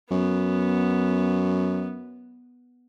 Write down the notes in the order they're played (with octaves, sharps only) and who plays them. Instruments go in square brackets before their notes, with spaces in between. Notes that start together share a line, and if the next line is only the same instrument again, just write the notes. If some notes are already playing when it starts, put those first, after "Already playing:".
[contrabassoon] F#2 [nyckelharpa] B3